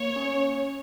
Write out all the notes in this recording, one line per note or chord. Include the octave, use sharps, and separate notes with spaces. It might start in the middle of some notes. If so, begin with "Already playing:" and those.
Already playing: A#3 C#5
C#4